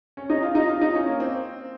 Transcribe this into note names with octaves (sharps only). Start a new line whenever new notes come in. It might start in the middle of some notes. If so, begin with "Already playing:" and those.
C#4
D#4
F4
D#4
F4
D#4
C#4
A#3
C4